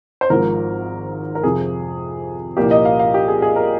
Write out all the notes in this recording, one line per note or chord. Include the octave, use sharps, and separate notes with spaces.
C5
G#1 G#2 F3 A#4
A#4
F2 C3 F3 G#4
C2 A#2 F3 A#3 G4
D#5
F5
F5
G4
G#4
G#4
A#4